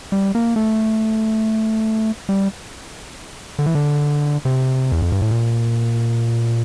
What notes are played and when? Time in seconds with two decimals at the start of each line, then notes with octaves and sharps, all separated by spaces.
0.12 G3
0.35 A#3
0.56 A3
2.29 G3
3.59 D3
3.66 E3
3.75 D3
4.45 C3
4.92 E2
5.02 F2
5.12 G2
5.22 A2
5.31 A#2